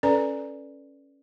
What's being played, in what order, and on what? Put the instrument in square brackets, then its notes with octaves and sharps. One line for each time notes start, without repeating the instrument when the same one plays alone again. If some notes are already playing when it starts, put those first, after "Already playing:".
[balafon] C#4 A4 B4 D5 A#5